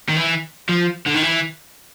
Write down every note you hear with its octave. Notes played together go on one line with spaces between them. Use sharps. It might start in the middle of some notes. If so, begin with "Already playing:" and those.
D#3
E3
F3
D3
D#3
E3